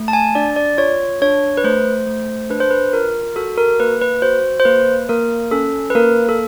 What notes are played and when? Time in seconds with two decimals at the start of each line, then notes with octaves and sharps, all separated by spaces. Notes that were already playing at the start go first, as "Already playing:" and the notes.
Already playing: A3
0.08 A5
0.13 G#5
0.35 D4 D5
0.56 D5
0.78 F4 C#5
1.22 D4 C#5
1.57 B4
1.64 A3 C5
2.07 A3
2.50 D4 B4
2.60 C5
2.70 B4
2.93 F4 A#4
3.36 F#4 A4
3.58 A#4
3.79 A#3 B4
4.01 B4
4.22 F#4 C5
4.60 C5
4.65 A#3 B4
5.09 A#3 A#4
5.51 C#4 A4
5.90 B4
5.95 A#3 A#4
6.29 A4